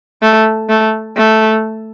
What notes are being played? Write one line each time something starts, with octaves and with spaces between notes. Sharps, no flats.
A3
A3
A3